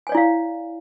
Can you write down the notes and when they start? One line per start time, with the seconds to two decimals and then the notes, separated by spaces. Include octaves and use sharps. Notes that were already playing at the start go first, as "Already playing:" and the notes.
0.07 G#5
0.09 C#5
0.12 D5
0.15 E4
0.17 F5